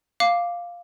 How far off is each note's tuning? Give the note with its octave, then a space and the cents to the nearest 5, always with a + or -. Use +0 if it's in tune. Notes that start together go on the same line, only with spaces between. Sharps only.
F5 +0 D6 +0